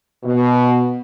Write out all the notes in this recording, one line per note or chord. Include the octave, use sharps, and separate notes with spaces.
B2